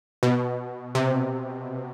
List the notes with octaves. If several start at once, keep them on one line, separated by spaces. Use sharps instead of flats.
B2
C3